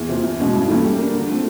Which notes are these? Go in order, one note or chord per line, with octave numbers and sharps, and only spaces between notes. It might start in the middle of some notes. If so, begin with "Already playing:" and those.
Already playing: E2
C3 F3
E2
B2 G#3 C#4 F#4
G2
E3 A3 C#4 E4
G3
A#3 D4
D3
F3 A3 C4